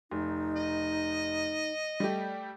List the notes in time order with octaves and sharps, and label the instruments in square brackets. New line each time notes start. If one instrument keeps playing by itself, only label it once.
[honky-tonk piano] F1 [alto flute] D#4
[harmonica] D#5
[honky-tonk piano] G3 A3 G4